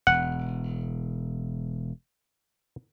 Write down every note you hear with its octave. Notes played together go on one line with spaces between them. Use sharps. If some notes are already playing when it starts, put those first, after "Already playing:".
E1 F#5